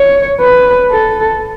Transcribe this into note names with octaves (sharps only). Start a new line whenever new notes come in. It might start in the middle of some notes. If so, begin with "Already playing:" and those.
Already playing: C#5
B4
A4